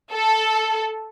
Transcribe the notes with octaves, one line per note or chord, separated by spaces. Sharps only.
A4